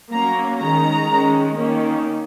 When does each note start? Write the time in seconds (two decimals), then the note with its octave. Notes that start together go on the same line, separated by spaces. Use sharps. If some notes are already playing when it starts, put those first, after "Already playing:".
0.12 F#3 A#3 C#4 A#5
0.59 D#3 G#3 C#4 A#5
1.08 D#3 G#3 C#4
1.55 D#3 A#3 C#4